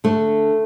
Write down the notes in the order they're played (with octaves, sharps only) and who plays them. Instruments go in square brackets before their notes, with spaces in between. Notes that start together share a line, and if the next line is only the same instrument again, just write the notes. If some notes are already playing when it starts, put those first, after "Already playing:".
[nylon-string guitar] D3 A3